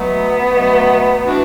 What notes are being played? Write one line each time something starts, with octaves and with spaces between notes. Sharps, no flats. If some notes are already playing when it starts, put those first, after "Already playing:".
Already playing: B2 F#3 A3 B3
B2 F#3 A3
E3 D4 F#4